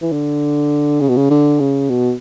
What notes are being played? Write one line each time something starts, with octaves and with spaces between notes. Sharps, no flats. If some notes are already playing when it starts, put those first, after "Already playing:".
E3
D3
C#3
B2
C#3
D3
C#3
B2